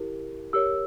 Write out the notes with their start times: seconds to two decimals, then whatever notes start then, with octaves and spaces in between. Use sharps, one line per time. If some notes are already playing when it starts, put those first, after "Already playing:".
Already playing: E4 G4 A#4
0.53 G4 A#4 C#5 E6